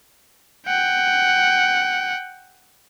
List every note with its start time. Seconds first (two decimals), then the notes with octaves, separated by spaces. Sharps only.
0.68 F#5 G5